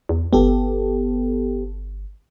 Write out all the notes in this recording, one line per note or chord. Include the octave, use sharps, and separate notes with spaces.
E2
G1 B3 G4 A4